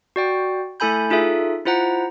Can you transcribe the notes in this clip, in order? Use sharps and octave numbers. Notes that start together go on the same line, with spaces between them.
F#4 D5 G5
A3 E4 A4 G#5 B5 G6
D#4 F4 G#4 A4 E5
E4 F4 C5 F#5 A#5